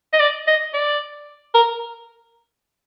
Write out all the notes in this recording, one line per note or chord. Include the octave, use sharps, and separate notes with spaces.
D#5
D5
D#5
D5
A#4